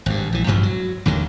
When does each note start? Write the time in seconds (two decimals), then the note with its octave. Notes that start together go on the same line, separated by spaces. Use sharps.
0.06 G#1 G2
0.33 A#1 E3
0.47 A1 D2 G2 F3
0.63 F#3
1.06 A1 D#2 D3 D#3